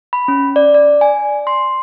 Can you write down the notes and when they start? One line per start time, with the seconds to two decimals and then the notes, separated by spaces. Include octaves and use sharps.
0.13 B5
0.28 C#4
0.56 D5
0.74 D5
1.01 G#5
1.47 C6